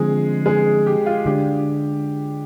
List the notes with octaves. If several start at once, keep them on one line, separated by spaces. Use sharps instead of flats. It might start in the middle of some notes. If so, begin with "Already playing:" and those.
Already playing: D3 F3 G#3 C4 G#4
G#3 G#4
G4
F4
D3 G#3 D4 G4